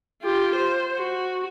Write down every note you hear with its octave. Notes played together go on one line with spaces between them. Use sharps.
F4 G4
C5
F#4